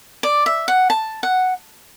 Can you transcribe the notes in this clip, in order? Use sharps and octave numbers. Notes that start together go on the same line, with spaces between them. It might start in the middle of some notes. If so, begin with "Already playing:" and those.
D5
E5
F#5
A5
F#5